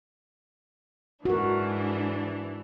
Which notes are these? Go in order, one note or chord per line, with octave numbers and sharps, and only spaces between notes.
G#2 E3 D4 F#4 A#4